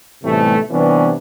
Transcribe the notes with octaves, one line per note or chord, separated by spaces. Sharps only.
B1 A2 C3 E3 G3 A3
C3 E3 G3 B3 C#4 D4